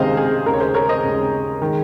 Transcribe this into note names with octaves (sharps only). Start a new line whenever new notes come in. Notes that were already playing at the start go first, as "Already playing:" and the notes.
Already playing: C#2 C3 D#3 G#3 G#4 C5 D#5 F5
G#4
D#2 C#3 G#3 A#4
C#5
G#4 C5
A#4 C#5
C5 D#5
D#2 C#3 G#3
D#3 G#3